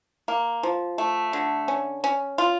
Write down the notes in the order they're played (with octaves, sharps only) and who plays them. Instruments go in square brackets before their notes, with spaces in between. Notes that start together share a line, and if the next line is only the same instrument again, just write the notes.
[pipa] A#3
F3
A3
D3
C#4
C#4
F4